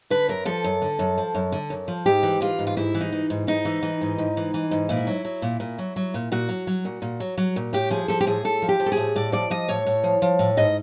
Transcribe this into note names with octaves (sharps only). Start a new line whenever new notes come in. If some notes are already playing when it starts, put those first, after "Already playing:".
D3 B4
F#2 A#4
F3 A4
F#2
D3
F#2
F3
F#2
D3
F#2
F3
G#2 G4
E3
E3 F4
G#2
F4
G#2 E4
E3
D#4
E3
G#2
G#2 D#4
E3
E3
G#2
G#2
E3
E3
G#2
A#2 E4
F#3
F#3
A#2
A#2
F#3
F#3
A#2
A#2 F#4
F#3
F#3
A#2
A#2
F#3
F#3
A#2
A2 G4
F3 G#4
F3 A4
G4
A2 G#4
A2 A4
F3
G4
F3
A4
G#4
A2
A2 D5
F3 D5
F3 D#5
A2 C#5
A2
F3
F3
A2
G#2 D#5